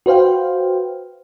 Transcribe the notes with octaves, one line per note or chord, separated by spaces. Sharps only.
F#4 B4 C5 F5 G5